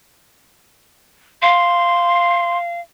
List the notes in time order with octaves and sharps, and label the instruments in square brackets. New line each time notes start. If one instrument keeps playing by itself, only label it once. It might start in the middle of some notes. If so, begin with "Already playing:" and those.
[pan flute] F5 [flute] C6